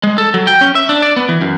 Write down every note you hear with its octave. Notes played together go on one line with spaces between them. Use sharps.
G#3
A4
F#3
G5
C#4
E5
D4
D5
B3
E3
F#2